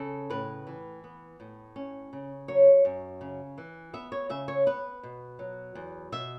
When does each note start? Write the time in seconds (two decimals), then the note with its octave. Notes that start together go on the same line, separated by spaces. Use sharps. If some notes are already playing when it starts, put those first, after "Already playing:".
Already playing: C#3 C#4 A4
0.30 A2 B4
0.67 E3
1.04 B3
1.40 A2
1.76 C#4
2.13 C#3
2.48 F#3 C#5
2.85 F#2
3.21 C#3
3.58 E3
3.93 B3 E5
4.12 C#5
4.30 C#3 E5
4.48 C#5
4.66 B3 B4
5.03 B2
5.39 F#3
5.75 E2
6.12 B2 E5